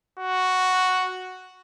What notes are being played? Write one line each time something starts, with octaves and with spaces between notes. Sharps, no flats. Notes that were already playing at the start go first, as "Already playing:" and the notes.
F#4